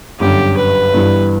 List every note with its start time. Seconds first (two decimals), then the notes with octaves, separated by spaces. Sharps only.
0.20 G1 F#2 D3 G4
0.57 B4
0.93 G1 G2 E3